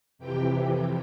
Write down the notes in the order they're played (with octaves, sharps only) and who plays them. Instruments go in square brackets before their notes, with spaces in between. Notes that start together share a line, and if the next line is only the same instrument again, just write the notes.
[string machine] F2 C3 E3 G4 G5